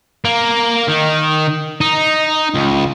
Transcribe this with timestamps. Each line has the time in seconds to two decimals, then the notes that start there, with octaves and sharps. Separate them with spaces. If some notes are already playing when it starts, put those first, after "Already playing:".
0.25 A#3
0.88 D#3
1.81 D#4
2.55 C#2